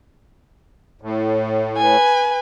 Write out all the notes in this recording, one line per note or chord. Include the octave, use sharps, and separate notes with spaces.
A2
B4 G#5